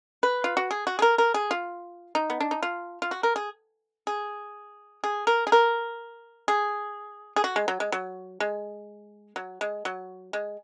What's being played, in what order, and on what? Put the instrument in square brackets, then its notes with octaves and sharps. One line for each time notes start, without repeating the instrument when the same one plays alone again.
[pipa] B4
F4
F#4
G#4
F#4
G#4
A#4
A#4
G#4
F4
D#4
B3
D4
D#4
F4
F4
F#4
A#4
G#4
G#4
G#4
A#4
G#4
A#4
G#4
G#4
F#4
G#3
F#3
G#3
F#3
G#3
F#3
G#3
F#3
G#3